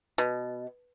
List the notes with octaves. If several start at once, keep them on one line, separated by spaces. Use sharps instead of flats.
B2